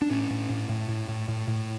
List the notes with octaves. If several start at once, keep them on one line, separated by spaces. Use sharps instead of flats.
D4
A2 C#4
A2
A2
A2
A2
A2
A2
A2